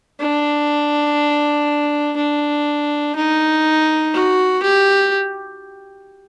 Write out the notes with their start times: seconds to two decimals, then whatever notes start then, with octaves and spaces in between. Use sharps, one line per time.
0.20 D4
2.17 D4
3.16 D#4
4.14 F#4
4.63 G4